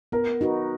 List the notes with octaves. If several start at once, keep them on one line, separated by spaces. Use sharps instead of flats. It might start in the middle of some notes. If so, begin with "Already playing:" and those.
B3 A#4
D#4 F#4 B4